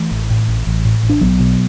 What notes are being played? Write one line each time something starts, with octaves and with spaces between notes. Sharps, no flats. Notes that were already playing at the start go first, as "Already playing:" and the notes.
Already playing: E3 A3
A1
A2
A1
A1
A2
A1
D4
B1 F#3 B3
B2